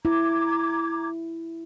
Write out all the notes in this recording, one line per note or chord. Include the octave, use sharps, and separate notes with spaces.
E4 A#5 D6 G#6